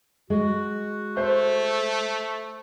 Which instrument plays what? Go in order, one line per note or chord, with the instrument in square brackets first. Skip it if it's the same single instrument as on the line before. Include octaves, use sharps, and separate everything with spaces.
[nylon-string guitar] G#3 [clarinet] F#4
[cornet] A3 [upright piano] C5